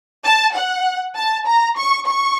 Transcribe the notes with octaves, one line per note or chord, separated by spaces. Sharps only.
A5
F#5
A5
A#5
C#6
C#6